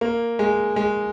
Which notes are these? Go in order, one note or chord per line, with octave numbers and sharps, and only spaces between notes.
A#3
G#3
G#3